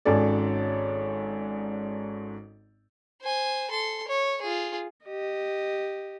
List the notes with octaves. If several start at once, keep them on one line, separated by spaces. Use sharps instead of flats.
G#1 G#2 C#4 A4 D5
C5 G#5
A4 C6
C#5
F4 G#4
G4 D#5